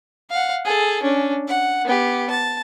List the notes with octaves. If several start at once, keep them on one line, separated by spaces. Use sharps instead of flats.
F5 F#5
G#4 A4
C#4 D4
F#5
B3 G4
A5